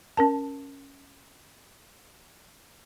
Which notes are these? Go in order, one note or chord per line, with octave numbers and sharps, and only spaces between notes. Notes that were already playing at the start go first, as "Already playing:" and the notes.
C#4 A#4 A5